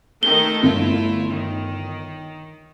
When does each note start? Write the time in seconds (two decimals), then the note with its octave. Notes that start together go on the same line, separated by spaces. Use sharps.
0.23 D#3 A3 A4 G7
0.63 G1 A3 E4 F4
1.29 D#3